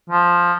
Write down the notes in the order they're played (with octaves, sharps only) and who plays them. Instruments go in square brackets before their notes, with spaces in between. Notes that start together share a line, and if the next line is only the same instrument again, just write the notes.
[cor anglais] F3